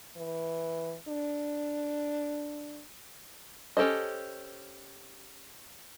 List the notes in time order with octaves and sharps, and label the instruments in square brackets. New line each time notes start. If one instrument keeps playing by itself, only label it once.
[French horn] E3
D4
[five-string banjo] C#4 G4 A4 C5 D#5